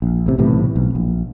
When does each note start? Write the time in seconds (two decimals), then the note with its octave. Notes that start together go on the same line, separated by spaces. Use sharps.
0.02 A#1
0.26 A1 C3
0.38 B1 A2 C3 E3
0.76 B1
0.95 A#1